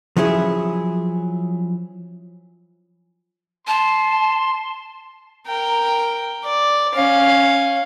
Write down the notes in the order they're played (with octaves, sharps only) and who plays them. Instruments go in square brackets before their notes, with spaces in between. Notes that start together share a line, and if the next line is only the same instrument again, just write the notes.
[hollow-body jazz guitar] F3 F#3 C#4 E4 G#4
[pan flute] A5 [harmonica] C6
[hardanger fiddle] A#4 G5
D5
C#4 F5